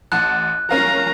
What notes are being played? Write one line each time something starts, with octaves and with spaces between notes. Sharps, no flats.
A1 F#5 A5 F#6
C#4 A#4 F5 A#5